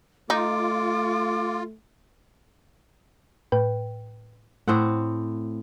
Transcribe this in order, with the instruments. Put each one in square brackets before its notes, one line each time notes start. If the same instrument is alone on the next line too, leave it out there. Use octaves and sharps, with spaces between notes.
[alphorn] A3 [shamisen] D#4 [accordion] F4 [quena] D6
[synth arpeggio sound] A2 B4 G5
[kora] A2 C4 F#5 [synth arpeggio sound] A3